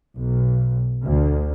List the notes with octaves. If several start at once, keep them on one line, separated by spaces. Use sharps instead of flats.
B1
D2